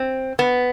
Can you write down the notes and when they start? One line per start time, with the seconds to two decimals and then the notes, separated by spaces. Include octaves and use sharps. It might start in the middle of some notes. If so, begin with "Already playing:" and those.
Already playing: C4
0.39 B3